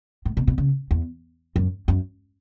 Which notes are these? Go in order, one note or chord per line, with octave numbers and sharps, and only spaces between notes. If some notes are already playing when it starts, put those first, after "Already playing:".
A2
B2
B2
C#3
E2
F#2
F#2